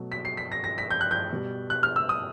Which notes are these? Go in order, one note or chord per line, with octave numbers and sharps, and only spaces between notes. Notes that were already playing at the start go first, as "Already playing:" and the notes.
Already playing: B2 F#3 A3
B6
C7
B6
A#6
A#6
B6
G6
F#6
G6
B2 G3
F#6
F6
E6
D#6